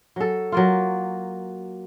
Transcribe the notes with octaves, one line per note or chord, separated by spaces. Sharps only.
F#3 A4
F#3 A#3 F4